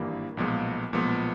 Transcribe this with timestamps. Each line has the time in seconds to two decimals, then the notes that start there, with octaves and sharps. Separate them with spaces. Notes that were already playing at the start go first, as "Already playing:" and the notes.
Already playing: G#1 G2 E3 G3 A#3
0.37 B1 A#2 F3 G#3 B3
0.93 B1 A#2 F3 G#3 B3